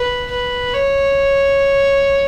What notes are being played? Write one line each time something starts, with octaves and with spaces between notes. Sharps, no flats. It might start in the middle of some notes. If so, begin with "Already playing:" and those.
Already playing: B4
B4
C#5